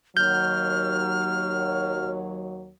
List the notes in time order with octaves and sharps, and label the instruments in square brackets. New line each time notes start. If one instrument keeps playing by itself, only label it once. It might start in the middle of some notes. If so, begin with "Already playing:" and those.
[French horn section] D#2 F#3 [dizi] F6 [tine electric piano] G6